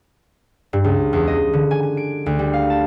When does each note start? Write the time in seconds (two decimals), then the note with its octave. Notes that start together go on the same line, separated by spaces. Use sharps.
0.73 G2
0.84 C#2
1.13 E2
1.27 D#5
1.53 D3
1.71 G#5
1.83 G#5
1.97 D7
2.26 D2
2.39 G3
2.53 F5
2.70 A5